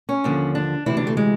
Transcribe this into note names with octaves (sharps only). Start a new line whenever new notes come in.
C#4
D#2 D3 F3
D4
D2 C3 E3 E4
D4
A3
G#3